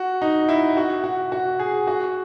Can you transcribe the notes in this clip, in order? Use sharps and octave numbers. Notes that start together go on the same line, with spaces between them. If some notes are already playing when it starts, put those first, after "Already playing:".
Already playing: F#4
D#4
E4
F#4
F#4
F#4
G#4
F#4